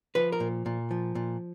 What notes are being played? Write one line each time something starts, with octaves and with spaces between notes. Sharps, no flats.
F3 B4
A#4
A#2
A#2
F3
A#2